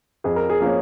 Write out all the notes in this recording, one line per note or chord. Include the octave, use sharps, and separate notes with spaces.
F2 G#4
A#4
G#4
F3 A#3 C#4